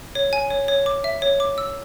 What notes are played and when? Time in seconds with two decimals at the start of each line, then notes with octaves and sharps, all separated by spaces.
0.15 C#5
0.33 G#5
0.51 C#5
0.68 C#5
0.86 D6
1.04 E5
1.22 C#5
1.40 D6
1.58 E6